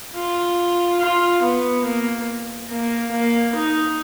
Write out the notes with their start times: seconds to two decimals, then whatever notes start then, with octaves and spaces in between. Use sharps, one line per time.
0.14 F4
0.99 F4
1.42 B3
1.85 A#3
2.69 A#3
3.11 A#3
3.55 D#4